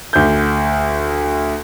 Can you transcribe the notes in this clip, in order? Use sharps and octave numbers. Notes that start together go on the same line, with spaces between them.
D2 G6